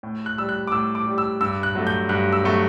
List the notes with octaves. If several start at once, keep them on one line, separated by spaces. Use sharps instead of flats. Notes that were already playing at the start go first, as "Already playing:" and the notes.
A2
F#6
G3 E6
F#6
D6
A2 E6
D6
G3
E6
G2 E6
F#6
F#3 A3
G6
G2 F#6
E6
F#3 A3 C#6